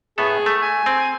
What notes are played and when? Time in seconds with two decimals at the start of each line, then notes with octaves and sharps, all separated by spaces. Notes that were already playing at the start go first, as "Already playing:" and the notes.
0.18 A2 B3 G#4 A4
0.46 A3
0.62 G#5
0.86 C4